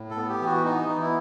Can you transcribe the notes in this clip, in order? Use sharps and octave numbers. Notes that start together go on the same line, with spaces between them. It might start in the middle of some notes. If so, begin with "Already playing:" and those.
Already playing: A2
A4
B3
G4
E3
F#4
B3 D#4
E3
E4